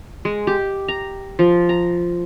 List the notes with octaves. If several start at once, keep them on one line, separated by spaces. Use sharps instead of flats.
G#3
G4
A#5
F3
A#5